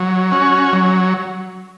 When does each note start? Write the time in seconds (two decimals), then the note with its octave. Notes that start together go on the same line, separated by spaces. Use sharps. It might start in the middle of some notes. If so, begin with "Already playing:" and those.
Already playing: F#3
0.31 C#4 F#4
0.73 F#3